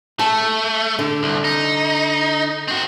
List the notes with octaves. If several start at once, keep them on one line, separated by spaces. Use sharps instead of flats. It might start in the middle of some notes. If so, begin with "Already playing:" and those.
A3 A5
D3
C2
D#4
C4 F#4